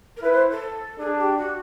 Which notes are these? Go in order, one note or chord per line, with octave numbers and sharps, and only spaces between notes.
A#4
E4 B4
C5
A4
D4 G#4
G4
F#4